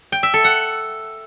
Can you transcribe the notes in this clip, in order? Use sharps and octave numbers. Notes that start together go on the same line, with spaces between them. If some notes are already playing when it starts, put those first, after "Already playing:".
G5
E5
A4
F#5